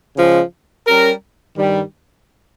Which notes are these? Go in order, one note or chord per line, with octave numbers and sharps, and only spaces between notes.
C#3 F3 G#3
G3 C#4 G4 A#4
G2 D#3 G3